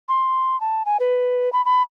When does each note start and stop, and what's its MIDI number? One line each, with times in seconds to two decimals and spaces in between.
0.09 0.59 84
0.61 0.83 81
0.86 0.97 80
1.00 1.52 71
1.53 1.64 83
1.65 1.82 83